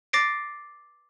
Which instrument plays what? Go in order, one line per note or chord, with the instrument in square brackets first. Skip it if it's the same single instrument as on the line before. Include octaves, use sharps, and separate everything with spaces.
[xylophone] D6 A6 A#6 C7 D7